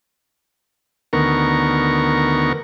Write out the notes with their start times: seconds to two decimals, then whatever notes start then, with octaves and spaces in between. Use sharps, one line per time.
1.13 D2 D#3 B3 A#4 C#6